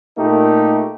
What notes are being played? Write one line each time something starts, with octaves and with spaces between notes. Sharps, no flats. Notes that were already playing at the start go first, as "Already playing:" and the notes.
A#2 A3 A#3 D#4 G4